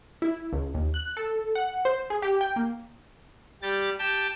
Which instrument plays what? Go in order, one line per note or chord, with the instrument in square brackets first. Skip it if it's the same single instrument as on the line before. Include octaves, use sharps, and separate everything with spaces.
[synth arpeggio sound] E4
C#2
D#2
F#6
A4
F#5
C5
G#4
G4
G5
A#3
[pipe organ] G3 G4 A6
G4 G5 A5